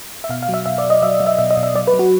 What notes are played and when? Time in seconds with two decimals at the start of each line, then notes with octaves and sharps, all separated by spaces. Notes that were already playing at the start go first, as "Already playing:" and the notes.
0.24 E5
0.29 B2 F5
0.43 F5
0.49 F#3
0.54 E5
0.66 B2 E5
0.78 D5
0.84 F#3
0.90 D#5
1.02 F#3 E5
1.20 F#3
1.27 E5
1.38 B2 E5
1.51 D#5
1.57 B2
1.63 E5
1.75 F#3 D5
1.87 B4
1.93 F#3
1.99 F#4